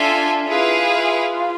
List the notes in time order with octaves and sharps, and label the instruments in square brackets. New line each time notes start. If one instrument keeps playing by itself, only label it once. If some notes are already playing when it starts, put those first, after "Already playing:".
Already playing: [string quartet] D4 [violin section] F4 A4 E5 G#5
[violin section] E4 G#4 B4 F5 [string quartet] F4
[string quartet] F4